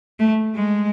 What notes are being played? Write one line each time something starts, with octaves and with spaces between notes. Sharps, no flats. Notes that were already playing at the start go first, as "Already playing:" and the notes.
A3
G#3